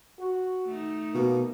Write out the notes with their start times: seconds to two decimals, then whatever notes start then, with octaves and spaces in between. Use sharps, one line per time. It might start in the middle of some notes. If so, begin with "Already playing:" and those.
0.20 F#4
0.67 A3 D#4
1.14 B2 A#3